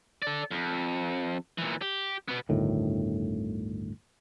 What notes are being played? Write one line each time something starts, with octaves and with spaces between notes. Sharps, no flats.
A4 D5
F2
A#2 E3
G4
B2 B3
G1 D2 A2 D#3